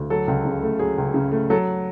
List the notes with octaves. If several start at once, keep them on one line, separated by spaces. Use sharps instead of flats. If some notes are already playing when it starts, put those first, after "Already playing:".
Already playing: D2
F#3 A4
C#2
C#3
A3
F#3 G#4
C#2
C#3
A3
F#3 A4